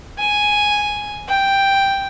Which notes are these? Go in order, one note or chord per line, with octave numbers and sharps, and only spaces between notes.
G#5
G5